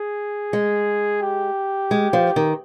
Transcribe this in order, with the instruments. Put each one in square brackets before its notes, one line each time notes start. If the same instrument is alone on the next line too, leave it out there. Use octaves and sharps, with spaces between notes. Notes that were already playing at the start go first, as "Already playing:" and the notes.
Already playing: [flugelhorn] G#4
[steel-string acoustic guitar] G#3
[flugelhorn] G4
[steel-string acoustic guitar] G#3
F3
D#3